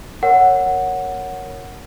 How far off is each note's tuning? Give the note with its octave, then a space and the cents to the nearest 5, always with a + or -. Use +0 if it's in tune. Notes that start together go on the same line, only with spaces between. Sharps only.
A#4 +0 C#5 +0 F#5 +0